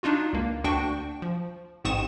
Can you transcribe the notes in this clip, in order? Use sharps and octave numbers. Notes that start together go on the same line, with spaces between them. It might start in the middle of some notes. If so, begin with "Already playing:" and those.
D4 D#4 F4 F#4
C#2 A#3
D2 D4 F#4 G5 C#6
F3
A1 G#2 C4 C#6 D#6 E7